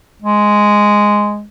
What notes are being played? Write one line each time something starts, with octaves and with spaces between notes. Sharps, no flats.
G#3